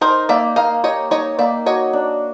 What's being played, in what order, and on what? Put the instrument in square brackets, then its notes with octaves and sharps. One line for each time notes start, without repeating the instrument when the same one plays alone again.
[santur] D#4 [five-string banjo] A#4 C5
[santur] A#3 [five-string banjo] D5 E5
[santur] A#3 [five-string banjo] D#5 F5
[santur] G4 [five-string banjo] C#5 D#5
[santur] D#4 [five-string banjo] C#5 D#5
[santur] A#3 [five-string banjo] D5 E5
[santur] F#4 [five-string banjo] C#5 D#5
[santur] D4